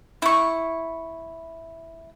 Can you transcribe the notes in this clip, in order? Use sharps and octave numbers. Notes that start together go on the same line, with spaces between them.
E4 C#6